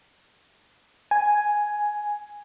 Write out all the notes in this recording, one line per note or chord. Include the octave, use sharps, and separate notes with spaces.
G#5